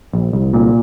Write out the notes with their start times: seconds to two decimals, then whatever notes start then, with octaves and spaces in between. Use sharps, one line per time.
0.13 A#1
0.33 C2
0.54 A#2